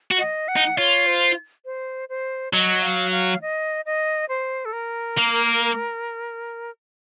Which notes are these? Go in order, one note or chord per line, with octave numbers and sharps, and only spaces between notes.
F#4
D#5
F#5
D#4
F4 C#5
C5
C5
C5
F#3 D#5
F5
F5
D#5
D#5
C5
A4
A#4
A#3